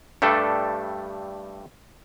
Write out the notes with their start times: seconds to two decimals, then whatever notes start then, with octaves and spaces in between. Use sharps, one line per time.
0.22 G2 G3 A3 D4 A4